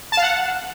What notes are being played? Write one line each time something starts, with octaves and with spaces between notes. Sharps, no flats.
A5
F5
F#5